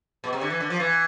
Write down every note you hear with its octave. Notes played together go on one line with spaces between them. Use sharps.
B2
C3
D3
E3
D3
F3
E3